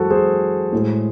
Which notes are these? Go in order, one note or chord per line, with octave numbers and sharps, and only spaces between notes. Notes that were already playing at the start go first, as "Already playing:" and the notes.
Already playing: F#2 E3 G#3 F#4 A4 C5
G#4 C5
A2 G#3